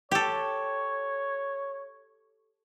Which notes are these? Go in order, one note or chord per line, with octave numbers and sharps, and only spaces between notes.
G4 A4 C#5